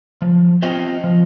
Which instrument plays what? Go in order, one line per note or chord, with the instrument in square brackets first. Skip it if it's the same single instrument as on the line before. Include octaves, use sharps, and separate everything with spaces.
[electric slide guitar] F3
C4 F4 C5 D#5
F3